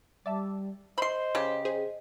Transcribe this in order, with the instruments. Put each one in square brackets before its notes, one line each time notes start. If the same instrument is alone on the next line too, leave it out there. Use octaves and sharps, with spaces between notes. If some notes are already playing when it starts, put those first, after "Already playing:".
[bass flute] G3 [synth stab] D5 E5 A5
[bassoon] C5 [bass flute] D#5 [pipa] B5 C6
[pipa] C#3 G4
[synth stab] G#4 C5